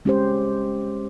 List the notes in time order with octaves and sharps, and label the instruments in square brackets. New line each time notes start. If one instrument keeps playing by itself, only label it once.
[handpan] G#3 C#4 G4 C5